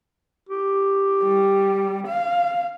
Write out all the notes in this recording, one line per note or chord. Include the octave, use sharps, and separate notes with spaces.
G4
G3
F5